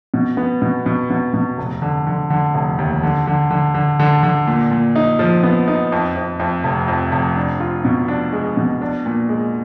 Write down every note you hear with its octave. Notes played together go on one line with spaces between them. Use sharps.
B2
B3
B2
B2
B2
B2
F1
D3
D3
D3
F1
D#2
D3
D3
D3
D3
D3
D3
A#2
A#2
D#4
F3
B3
D#4
F2
F2
F2
F1
F2
F1
D4
F4
B2
D4
G#3
B2
D4
A#2
G#3